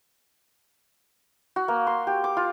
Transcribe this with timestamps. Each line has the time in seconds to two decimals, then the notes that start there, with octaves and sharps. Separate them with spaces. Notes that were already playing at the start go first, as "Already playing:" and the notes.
1.56 F#4
1.68 A#3
1.87 C6
2.07 G4
2.24 D6
2.37 F4